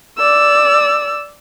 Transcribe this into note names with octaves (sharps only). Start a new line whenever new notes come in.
D5 E6